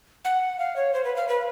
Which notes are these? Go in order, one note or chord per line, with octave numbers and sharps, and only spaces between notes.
F#5
F5
C#5
C5
B4
F5
B4